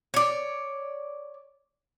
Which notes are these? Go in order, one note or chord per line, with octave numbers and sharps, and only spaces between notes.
C#5 D5